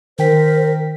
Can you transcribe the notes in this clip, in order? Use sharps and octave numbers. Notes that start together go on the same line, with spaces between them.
D#3 A#4 C5 G5 B6